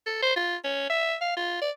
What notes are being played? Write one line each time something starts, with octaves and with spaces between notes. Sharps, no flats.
A4
C5
F4
C#4
E5
F5
F4
D5